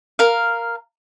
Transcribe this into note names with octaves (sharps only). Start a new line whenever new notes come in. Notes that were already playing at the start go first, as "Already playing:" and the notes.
A#4 F5